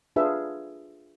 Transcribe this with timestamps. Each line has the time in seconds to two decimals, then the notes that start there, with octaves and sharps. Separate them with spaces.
0.16 D4 F4 G#4 B4 E5